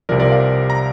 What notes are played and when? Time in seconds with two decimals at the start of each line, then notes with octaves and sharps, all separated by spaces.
0.09 C2 C3 F3 A#4 D5
0.20 A#4 D5
0.32 D5 F5
0.70 A#5